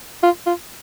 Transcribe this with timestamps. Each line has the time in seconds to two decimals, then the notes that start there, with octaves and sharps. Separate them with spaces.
0.23 F4
0.46 F4